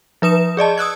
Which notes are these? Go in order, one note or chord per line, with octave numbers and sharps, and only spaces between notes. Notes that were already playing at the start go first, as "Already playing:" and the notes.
F3 B4 D#6 E7
G#4 D5 D#5 A5
D#6 E6 F#6 G#6